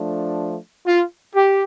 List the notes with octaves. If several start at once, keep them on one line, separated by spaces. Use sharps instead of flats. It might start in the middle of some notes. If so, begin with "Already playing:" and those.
Already playing: F3 A3 D4
F4
G4